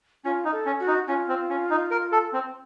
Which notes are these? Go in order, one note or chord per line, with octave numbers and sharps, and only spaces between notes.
C#4 F4
D#4
A4
C#4
F#4
D#4
C#4 F4
C4
C#4
D#4
A#4
A4
C4